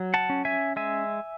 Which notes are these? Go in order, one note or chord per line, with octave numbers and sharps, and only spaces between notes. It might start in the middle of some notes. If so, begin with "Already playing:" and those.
Already playing: F#3
F#5 A5
C#4
E5 G#5
G#3 E5 G#5